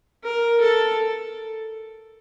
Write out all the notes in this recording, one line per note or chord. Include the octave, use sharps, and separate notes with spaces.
A#4
A4